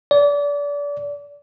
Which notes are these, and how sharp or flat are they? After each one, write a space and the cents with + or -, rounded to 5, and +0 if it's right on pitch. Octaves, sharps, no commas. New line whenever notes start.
D5 -30